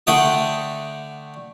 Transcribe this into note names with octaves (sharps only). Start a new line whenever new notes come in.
D3 A3 F#5 G5 D#6